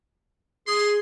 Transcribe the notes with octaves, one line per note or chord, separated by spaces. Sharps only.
G#4 C6